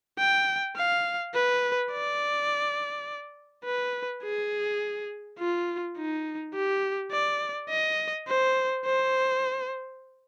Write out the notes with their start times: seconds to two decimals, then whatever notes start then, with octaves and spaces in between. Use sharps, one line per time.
0.19 G5
0.77 F5
1.35 B4
1.92 D5
3.65 B4
4.23 G#4
5.39 F4
5.97 D#4
6.54 G4
7.12 D5
7.70 D#5
8.28 C5
8.85 C5